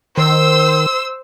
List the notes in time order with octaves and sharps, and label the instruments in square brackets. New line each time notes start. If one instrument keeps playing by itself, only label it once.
[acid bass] D#3 [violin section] C5 E6